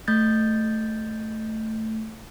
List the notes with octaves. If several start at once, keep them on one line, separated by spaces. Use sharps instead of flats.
A3 G6 A6